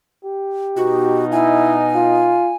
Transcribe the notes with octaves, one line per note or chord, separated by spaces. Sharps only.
G4
B2 D#4 F#4
E4 G#5
F4